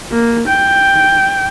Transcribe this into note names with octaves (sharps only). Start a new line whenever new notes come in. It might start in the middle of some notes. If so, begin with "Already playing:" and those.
A#3
G5